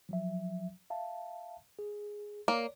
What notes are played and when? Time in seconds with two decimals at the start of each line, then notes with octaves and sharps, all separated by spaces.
0.09 F3 F#3 E5
0.90 E5 F5 A5
1.79 G#4
2.48 A#3 C#5 D5